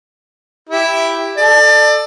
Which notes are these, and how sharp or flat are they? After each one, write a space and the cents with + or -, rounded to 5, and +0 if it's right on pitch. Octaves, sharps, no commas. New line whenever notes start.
E4 +0 G4 +0
A4 +0 D5 +30